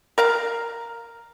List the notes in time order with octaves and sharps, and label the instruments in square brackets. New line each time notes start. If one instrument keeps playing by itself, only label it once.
[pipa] A#4 F5 A#5